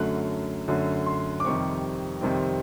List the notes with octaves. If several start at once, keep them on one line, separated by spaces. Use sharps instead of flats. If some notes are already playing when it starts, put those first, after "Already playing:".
Already playing: F#2 D3 F#3 A3 F#6
F#2 D3 F#3 A3
C6
D6
F2 C3 D#3 G3 C4 C#6
F2 C3 D#3 G3 C4